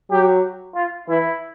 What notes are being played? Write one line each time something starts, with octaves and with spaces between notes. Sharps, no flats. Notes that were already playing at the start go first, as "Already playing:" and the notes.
F#3 G4
F4
E3 E4